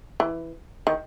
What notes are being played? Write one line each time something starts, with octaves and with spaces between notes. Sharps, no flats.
E3
D#3